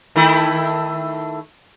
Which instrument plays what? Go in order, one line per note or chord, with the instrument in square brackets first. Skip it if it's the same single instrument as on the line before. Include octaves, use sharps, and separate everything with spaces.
[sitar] D#3 A3 E4